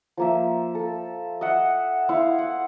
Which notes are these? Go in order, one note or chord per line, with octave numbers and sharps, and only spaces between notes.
F3 A#3 E5
A4
D#5 E5 F#5
E4 C5 F5 F#5
F#5